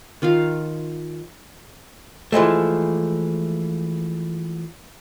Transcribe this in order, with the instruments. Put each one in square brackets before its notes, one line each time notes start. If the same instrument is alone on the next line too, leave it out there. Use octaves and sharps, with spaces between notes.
[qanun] D#3 F4 D#5 F5
[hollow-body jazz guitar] E3 F3 G#3 A3